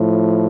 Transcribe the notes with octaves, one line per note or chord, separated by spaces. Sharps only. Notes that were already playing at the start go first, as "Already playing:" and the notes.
Already playing: A2 F3